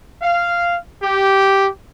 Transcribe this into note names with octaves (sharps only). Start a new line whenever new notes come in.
F5
G4